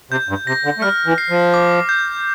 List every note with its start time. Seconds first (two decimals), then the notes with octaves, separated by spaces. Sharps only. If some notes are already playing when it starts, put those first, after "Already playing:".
0.11 C3 G6
0.29 G2
0.47 C3 A#6
0.65 D3
0.78 A3
0.82 G3 F6
1.06 E3
1.18 C7
1.30 F3
1.54 D6
1.89 G6